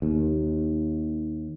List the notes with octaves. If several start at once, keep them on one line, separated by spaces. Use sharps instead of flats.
D#2